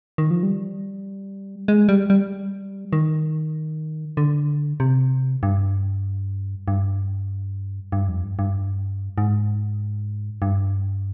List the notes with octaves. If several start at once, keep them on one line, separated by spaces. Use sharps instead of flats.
D#3
F3
G3
G#3
G3
G3
D#3
D3
C3
G2
G2
G2
F2
G2
G2
G#2
G2